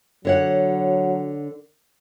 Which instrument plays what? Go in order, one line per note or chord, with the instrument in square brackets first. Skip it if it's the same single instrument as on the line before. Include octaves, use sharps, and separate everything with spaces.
[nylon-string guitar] D3 C#5 F#5 [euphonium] F#3